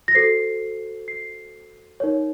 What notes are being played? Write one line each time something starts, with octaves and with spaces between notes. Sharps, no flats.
A#6
F#4 A4 C5 C7
C7
D#4 A#4 C#5